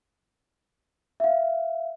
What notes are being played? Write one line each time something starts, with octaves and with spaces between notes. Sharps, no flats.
E5 F5